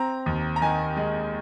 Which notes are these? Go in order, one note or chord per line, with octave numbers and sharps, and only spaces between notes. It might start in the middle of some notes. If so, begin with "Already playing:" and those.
Already playing: C4 A#5
D#2
A#5
D#3 G#5
G#3